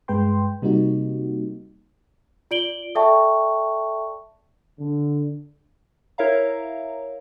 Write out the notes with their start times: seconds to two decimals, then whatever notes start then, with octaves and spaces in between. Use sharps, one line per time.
0.08 G2 G#3 B4 G5 C6
0.62 C3 G3 A#3 D#4 F#4
2.51 F4 D5 D7 F#7 G7
2.95 A4 D5 E5 G5 A5 C#6
4.80 D3
6.18 E4 A#4 C#5 E5 F5 A#5